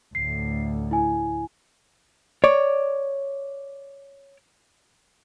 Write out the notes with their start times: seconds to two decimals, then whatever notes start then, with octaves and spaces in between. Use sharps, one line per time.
0.15 D2 A2 C7
0.91 E4 G#5
2.44 C#5 D5